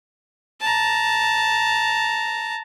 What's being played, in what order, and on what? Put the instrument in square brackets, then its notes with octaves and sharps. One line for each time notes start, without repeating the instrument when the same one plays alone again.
[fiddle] A5 A#5